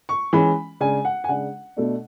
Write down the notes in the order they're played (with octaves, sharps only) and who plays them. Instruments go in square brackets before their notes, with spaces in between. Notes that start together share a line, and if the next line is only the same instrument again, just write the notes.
[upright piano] C#6
E3 G#3 C#4 B5
C#3 G#3 D4 G#5
F#5
G#5
C#3 G#3 D4 F#5
B2 A3 D4